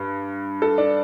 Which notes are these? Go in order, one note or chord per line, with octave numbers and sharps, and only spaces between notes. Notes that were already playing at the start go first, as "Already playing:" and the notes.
Already playing: G2
A4
D4